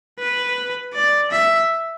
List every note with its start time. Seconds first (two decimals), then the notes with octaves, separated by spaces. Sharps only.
0.19 B4
0.93 D5
1.31 E5